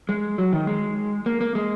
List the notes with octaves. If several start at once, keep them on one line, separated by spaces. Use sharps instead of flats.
G#3
F#3
D#3
G#3
A#3
A#3
G#3